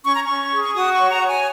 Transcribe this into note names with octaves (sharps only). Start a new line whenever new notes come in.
C#4 C#6
A#5
C#6
C#4
G#4
C#6
F#4 D#6
C#6
C#5
A#5
C#5
G#5